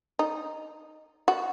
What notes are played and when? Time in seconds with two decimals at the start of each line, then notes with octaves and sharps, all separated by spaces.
0.19 D#4
1.28 F#4